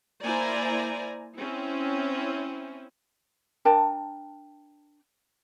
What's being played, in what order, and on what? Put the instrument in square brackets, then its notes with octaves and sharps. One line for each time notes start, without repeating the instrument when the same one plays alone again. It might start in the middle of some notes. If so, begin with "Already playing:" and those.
[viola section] A#3 E4 C5 D5 G#5 A#5
C4 C#4 E4
[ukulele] D4 A#4 G5 A5